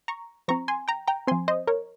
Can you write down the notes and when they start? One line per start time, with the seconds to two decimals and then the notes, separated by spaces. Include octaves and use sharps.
0.08 A#5 C#6
0.48 F3 C4 A#5 C#6
0.68 G#5 C6
0.88 G5 A#5
1.08 G5 A#5
1.27 F3 C4 G#5 C6
1.48 C5 D#5
1.67 A#4 C#5